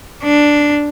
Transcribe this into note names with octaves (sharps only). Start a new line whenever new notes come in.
D4